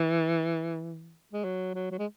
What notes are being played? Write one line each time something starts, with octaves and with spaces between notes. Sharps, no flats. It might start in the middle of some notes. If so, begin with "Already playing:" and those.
Already playing: E3
G#3
F#3
F#3
F#3
G#3